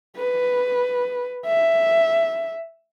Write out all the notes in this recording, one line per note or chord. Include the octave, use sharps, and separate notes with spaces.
B4
E5